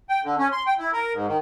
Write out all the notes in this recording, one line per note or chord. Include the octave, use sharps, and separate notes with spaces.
G5
D3
C#4
C6
G5
E4
A#4
G#2
D#3